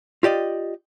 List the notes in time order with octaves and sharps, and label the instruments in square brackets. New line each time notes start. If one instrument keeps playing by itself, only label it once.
[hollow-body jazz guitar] F4 G4 D5 D#5